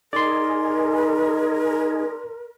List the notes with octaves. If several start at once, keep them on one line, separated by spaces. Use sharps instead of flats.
D#4 G#4 A#4 D5 C6